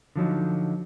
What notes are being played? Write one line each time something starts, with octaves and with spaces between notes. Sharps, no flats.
D3 F3 F#3 D#4